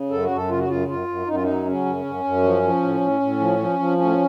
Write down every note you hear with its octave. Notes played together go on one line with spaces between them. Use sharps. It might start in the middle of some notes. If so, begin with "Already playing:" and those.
Already playing: C#3
F#2 A4
F#4
F#2
A4
C#3 F4
F#4
F#2 F4
F#2 F4
F#2
F#2 D#4
F4
F#3 D#4
C#3 C#4
F#2
F#2
F#2
F3
F3
A2
A2
A2
F3
F3
F3
A2 C#4